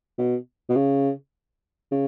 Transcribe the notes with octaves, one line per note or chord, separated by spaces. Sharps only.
B2
B2
C#3
C#3